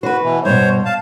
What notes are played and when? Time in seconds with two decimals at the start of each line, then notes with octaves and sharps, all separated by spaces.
0.03 F#4 B4 C5
0.22 B2 E3
0.45 G2 B2 C5 C#5
0.85 F5 A5